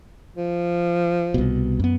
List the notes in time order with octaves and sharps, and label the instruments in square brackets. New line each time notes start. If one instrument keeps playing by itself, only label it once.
[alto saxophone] F3
[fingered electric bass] C2 B2
F#2 B3